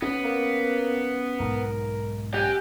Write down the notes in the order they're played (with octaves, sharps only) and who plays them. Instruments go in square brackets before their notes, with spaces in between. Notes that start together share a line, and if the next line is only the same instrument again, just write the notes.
[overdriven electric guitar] B3 [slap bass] C#4
[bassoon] A#3
[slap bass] B1 G#2 [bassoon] A#4
[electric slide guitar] G4 [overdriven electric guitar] F#5 G#5